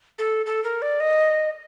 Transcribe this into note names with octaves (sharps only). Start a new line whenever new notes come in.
A4
A4
A#4
D5
D#5